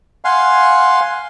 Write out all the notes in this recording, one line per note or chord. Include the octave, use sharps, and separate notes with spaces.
F5 F#5 G#5 C6